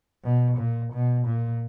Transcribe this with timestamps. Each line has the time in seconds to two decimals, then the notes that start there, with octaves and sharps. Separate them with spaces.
0.24 B2
0.58 A#2
0.93 B2
1.26 A#2